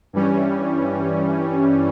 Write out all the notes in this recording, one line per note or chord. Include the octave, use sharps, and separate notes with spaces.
G2 E3 G3 C#4